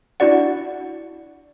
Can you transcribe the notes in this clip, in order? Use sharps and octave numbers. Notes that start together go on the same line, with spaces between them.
D4 E4 F#4 D5 F#5